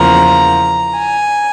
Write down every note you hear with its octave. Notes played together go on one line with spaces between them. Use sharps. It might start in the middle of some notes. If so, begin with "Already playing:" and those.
Already playing: E2 C#3 F3 A#3 A#5
G#5